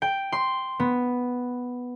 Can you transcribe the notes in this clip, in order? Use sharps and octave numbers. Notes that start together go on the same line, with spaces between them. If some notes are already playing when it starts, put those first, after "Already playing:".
G5
C6
B3